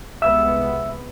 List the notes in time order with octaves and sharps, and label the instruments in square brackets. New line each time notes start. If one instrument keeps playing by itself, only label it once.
[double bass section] C2 G#3 B3 [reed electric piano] E5 E6